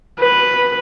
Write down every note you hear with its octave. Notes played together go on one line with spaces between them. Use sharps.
B4